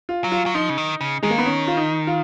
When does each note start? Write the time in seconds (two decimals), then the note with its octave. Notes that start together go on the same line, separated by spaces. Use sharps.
0.09 F4
0.24 F#3
0.32 F4
0.46 F#3
0.55 F3 D#4
0.69 C#3
0.78 D#3
1.01 C#3
1.23 D#3 G#3
1.30 A#3
1.38 B3
1.46 C#4
1.68 F4
1.77 D#4
2.07 F4